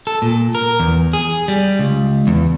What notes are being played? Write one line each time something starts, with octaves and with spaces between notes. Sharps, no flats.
A4
A#2
A#4
E2
G#4
G3
C#2
E2